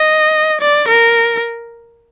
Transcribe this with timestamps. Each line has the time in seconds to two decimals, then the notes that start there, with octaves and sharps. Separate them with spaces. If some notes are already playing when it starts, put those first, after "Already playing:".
Already playing: D#5
0.61 D5
0.88 A#4